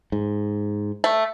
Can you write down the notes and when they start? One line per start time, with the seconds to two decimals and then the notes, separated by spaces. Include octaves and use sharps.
0.12 G#2
1.04 A3